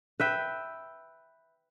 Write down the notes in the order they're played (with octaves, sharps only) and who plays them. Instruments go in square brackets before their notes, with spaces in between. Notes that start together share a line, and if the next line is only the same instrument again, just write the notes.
[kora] B4 E5 G5